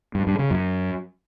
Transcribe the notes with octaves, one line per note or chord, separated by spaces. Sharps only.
G2
G2
C#3
F#2